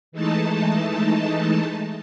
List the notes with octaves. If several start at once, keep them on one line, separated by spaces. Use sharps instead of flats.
E3 G#3 A3 D#4 A5